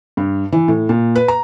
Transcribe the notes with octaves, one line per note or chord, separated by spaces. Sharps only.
G2
E3
A2
A#2
B4
A#5